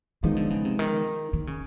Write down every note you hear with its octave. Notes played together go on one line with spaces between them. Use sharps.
D#3 F3 G#3 B3 D#4
D3
C#3
C3
D#3
D#3
C#3